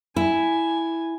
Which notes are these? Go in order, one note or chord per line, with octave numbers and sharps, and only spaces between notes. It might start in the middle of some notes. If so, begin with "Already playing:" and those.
E4 G#5